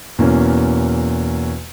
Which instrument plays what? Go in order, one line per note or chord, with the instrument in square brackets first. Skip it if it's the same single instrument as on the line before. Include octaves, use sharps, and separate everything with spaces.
[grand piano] E2 B2 A#3 C#4